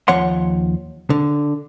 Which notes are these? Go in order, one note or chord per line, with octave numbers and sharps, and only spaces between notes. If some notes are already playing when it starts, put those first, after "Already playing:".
D#2 F3 C#5 F#5 C6
D3